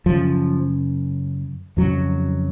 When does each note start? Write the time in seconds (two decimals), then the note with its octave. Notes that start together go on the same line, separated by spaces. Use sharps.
0.06 F#2 C#3 F3
1.77 F2 C#3 F#3